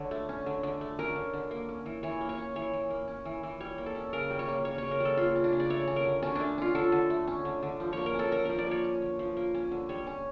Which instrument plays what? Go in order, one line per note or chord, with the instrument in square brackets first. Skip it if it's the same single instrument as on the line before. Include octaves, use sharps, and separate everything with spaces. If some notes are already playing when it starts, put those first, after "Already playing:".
Already playing: [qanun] D3 C#5
A3
C#4
D3
D3
A3
C#4 A#4
D3
D3
A#3
C#4
E3
E3 C#5
A#3
C#5
C#4
E3 C#5
E3
A#3
C#4
E3
E3
G3 C#5
A#3
A4
C#4
C#3 A#4
G3
C#5
A#3
C#4 C#5
C#3 C#5
A#4
G3 A4
A#3 F4
C#4
D4
C#3
D5
A3 C#5
C#4
A#4
D3
D3 C#4
A3 D4
C#4 F4
D3 A4
D3
A3
C#4
D3
D3
F3
A#3 C#5
A#4
C#4 A4
D3 A#4
F3 A#4
D5
A#3 C#5
C#4
D3
F3
A#3
C#4
D3
G3 C#5
C#4